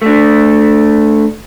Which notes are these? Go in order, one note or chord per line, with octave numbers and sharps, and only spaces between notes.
A3 D4